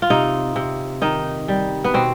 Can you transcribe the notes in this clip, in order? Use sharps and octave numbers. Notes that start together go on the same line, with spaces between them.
F4
C3 D#4
C3
D#3 D#4
G3
B3
B2 C4